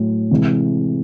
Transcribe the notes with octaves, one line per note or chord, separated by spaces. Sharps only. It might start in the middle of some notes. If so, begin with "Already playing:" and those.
Already playing: A2 F#3
C3 E3 G#3